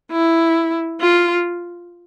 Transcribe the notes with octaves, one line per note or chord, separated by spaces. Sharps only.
E4
F4